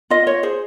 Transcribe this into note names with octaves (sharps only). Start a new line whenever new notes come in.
F4 D#5
C#5
G#4 C5